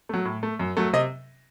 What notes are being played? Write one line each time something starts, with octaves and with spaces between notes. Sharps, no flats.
F#3 A3
A2
A3
F#2
F#3 A3
C3 D#5